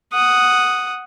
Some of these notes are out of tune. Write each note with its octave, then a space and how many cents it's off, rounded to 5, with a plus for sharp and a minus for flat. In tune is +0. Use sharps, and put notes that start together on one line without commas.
F#5 +0 D#6 +0